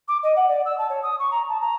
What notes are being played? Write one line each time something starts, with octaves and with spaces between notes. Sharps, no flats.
D6
D#5
F#5
D5
E6
A5
C#5
D#6
C#6
A#5
A5
A#5